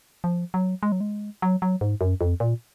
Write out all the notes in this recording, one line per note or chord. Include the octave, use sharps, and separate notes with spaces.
F3
F#3
G#3
F#3
G#3
F#3
F#3
G#2
F#2
F2
A#2